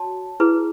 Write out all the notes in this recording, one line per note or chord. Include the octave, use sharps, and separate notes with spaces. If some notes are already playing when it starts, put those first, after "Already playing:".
Already playing: F#4 C#5 A5
E4 G#4 B4